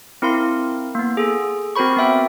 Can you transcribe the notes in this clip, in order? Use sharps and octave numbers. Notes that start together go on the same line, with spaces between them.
C4 E4 A#4 F5 C6
A#3 B3
G#4 A4
C4 F#4 A#4 C5 B5 C#6
B3 C4 E5 G5